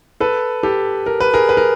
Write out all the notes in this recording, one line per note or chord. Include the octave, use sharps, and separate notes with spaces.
A4 B4
G4 A4
A#4
B4
G#4 A#4
B4
A#4